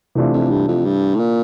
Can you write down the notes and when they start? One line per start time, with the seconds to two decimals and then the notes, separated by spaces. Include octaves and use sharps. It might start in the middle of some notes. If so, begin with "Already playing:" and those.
0.15 C3 E3 A3 D4 F4
0.33 F2
0.50 G2
0.68 F2
0.85 G2
1.15 A2
1.20 A#2